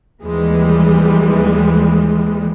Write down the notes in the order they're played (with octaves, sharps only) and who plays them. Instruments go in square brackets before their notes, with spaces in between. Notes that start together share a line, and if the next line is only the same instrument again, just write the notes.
[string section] D#2 E3 F3 G3 G#3